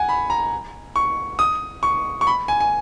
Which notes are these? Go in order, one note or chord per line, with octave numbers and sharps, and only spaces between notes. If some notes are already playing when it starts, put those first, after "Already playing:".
Already playing: F#5 G#5
B5
A#5
C#6
D#6
C#6
C#6
B5
G#5
G#5